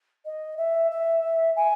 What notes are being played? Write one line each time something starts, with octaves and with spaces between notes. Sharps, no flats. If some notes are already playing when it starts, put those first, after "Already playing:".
D#5
E5
E5
G#5